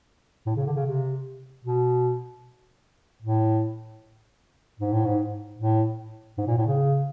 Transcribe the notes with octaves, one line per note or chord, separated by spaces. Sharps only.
A2
C#3
D3
C#3
C3
B2
A2
G#2
A2
G#2
A2
G#2
A#2
A2
C#3